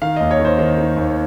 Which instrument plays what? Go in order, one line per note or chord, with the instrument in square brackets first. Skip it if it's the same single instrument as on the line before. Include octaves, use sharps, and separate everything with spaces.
[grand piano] D#3 F5
D#2 D#5
C#5
D#3
C5
D#3 C5
D#3
D#2